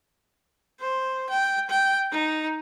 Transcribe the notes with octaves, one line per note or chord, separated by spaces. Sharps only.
C5
G5
G5
D#4